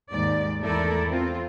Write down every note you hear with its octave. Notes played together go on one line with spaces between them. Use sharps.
D#2 G#2 D#3 D5
E2 A3 E4 A4 A#4 D5
C4 F4